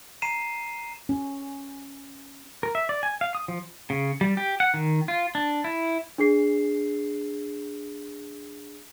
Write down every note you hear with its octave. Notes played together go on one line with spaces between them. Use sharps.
A#5 C7 D#7 E7
C#4
A#4
E5
D5
G#5
F5
D#6
F3
C#3
G3
G4
F#5
D#3
F4
D4
E4
D4 G#4 C7